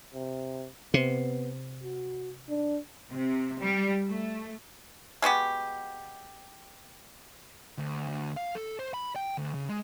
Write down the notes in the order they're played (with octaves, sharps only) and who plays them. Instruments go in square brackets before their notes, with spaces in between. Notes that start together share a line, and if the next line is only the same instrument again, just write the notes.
[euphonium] C3
[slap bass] C3 [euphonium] B3
[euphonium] F#4
D4
[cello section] C3
G3
A3
[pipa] G#3 B3 F#4 G4
[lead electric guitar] D2
D2
F5
A4
C5
B5
G5
D2
C#3
G#3